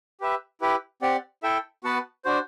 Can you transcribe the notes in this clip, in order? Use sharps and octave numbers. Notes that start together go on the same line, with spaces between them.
G4 B4 E5
E4 G4 B4
C4 G4 D5 F#5
E4 A4 E5 G5
B3 F#4 B4 F#5 A5
D4 F#4 C5